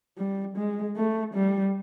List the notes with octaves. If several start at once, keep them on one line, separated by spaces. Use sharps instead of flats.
G3
G#3
A3
G3